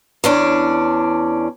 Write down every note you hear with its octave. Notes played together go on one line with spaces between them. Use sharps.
E2 C#4 D4